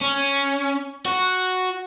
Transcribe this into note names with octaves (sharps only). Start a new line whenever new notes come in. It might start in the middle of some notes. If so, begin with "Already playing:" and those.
C#4
F#4